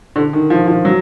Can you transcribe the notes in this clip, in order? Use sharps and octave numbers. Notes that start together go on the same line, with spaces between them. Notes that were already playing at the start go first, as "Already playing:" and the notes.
D3
D#3
F3
F3
F#3